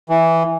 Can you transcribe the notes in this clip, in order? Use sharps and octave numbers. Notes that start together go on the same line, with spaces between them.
E3